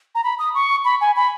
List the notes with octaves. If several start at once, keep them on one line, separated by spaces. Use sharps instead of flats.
A#5
B5
D#6
C#6
B5
G#5
B5